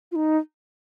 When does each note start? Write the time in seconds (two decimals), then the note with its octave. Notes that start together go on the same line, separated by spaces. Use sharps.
0.12 F4
0.16 D#4